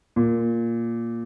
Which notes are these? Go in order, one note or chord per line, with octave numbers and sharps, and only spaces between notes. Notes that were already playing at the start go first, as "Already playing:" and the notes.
A#2